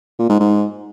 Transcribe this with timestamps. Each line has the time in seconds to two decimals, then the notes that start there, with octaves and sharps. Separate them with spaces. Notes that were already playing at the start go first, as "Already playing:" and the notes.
0.19 A#2
0.30 G#2
0.40 G#2